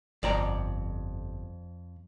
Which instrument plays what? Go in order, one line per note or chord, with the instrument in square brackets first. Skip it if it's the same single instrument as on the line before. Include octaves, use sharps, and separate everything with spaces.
[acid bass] G1 [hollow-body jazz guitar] F2 D5 A#5